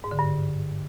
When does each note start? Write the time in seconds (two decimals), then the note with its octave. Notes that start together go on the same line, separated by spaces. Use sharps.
0.04 G#2
0.11 D3
0.19 G2